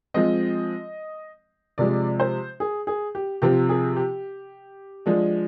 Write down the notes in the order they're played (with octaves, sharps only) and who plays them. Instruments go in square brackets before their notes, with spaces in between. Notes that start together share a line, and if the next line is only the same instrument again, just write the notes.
[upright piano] F3 G#3 C4 D#5
C3 F3 G#3 D5
C5
G#4
G#4
G4
C3 F3 C4 G4
G#4
G4
F3 G#3 D4